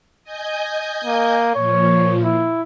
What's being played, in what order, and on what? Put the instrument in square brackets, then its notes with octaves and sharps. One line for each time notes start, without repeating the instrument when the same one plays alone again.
[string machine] D#5 G#5 G6
[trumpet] A#3
[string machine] A#2 F3 [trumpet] C#5
[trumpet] E4